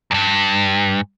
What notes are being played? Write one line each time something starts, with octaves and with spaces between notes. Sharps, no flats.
E2 G2